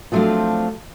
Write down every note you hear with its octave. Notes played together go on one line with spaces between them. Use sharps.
F3 F#3 A3 C4 D4 F4